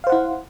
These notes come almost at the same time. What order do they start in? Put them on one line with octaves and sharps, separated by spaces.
F5 C5 F#5 E4